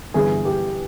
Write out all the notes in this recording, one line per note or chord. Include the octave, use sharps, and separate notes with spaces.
G1 G2 E3 G#4
G4